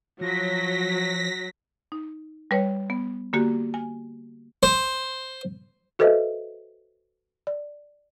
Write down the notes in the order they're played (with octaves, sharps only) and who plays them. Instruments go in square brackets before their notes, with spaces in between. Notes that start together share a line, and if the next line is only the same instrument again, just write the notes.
[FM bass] F3 [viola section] F#3 [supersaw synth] A#6 B6
[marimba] D#4
G3 B4 C#5
B3
D3 A#3 F#4 G4
G#5
[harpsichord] C5
[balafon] F#4 A4 B4 C5 D#5 E5
D5